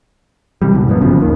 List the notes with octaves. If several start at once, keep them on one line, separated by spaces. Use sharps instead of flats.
C3 E3 G3
C#2 B2
F#2 A#2 G#3 B3
G1 C#3 F3
D#2 D#3